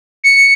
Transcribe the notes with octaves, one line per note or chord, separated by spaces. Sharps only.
C#7